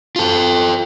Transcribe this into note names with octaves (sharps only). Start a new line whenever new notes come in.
F4 A4